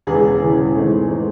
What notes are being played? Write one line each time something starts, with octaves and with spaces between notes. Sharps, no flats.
E1 E2 C#3 E3 G#4
E1 E2 C#3 E3
G#2 E3 A3 C4
E3 A3 C4